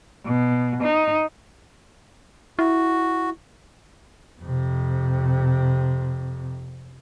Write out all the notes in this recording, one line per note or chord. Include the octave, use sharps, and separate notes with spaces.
B2
D#4
E4 F#4
F2 C3